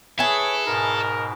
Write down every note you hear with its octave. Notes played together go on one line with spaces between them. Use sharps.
E4 G#4 A4 B4 C#5
G#2 B2 A#4